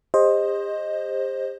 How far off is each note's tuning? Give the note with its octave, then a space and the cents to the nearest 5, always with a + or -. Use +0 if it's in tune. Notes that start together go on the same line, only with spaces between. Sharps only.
G4 +40 C5 +20 D#5 +0